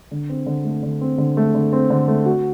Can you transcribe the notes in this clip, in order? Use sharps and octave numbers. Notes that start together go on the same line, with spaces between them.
D3
C4
D3
A3
D3
C4
D3
A3
D3
C4
D3
A3
F#4